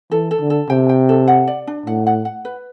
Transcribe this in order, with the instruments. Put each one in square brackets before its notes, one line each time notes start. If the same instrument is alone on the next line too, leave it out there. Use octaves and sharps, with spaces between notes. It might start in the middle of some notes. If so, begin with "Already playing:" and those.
[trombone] E3 [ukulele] A4
[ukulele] A4
[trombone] D3
[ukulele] A4
[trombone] C3 [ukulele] G5
[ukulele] G5
A4
F#5
D5
D4
[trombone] A2 [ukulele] F#5
[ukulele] F#5
F#5
B4